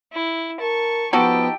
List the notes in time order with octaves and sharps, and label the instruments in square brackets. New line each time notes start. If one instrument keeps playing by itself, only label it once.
[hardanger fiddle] E4
[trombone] A#4 [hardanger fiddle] A5 C#6
[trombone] F3 [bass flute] B3 [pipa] D#4 F#4 A4 [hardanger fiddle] G4 G5